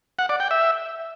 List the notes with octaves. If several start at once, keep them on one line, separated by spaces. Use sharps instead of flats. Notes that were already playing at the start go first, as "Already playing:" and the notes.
F#5
D5
G5
E5